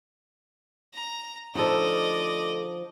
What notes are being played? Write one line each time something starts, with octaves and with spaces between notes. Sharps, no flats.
A#5
D2 F3 D#4 A4 D5 D#5